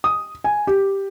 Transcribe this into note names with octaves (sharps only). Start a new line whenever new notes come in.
D#6
G#5
G4